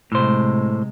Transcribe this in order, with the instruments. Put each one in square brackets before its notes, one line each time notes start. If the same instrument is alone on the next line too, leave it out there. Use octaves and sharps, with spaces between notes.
[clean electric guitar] A2 C5 [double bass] C3 G#3